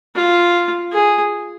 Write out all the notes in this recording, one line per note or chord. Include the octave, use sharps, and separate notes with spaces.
F4
G#4